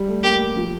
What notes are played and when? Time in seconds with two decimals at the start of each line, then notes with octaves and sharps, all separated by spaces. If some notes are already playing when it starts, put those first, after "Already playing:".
Already playing: G3
0.08 A3
0.23 A#3 G4
0.56 F3